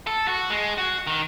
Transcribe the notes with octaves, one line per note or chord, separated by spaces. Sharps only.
A4
F#4
G#3
F#4
D#3